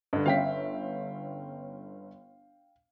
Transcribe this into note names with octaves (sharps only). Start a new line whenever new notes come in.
G2 D3 D#5
G1 C#4 E5 F5 G5 B6